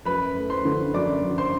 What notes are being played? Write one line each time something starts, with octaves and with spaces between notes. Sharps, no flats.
F#2 B4 B5
A3
C5 C6
D3
F#2 D5 D6
F#2
C5 C6